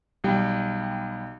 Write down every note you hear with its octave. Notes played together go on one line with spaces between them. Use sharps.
B1 G3 G5